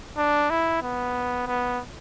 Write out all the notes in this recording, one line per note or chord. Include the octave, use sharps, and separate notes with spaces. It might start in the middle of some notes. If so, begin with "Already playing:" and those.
D4
E4
B3
B3